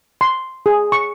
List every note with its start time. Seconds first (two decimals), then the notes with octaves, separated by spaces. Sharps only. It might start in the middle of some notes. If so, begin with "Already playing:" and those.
0.21 C6
0.66 G#4
0.92 C#6